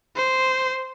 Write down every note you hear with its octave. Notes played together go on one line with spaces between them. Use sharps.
C5